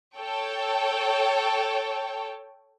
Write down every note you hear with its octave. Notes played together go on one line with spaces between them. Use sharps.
A4 C#5 G5